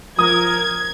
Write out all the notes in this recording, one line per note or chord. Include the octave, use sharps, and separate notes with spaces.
F3 A#4 D#6 G#6